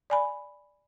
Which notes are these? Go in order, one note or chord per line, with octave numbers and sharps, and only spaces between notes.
D5 G#5 B5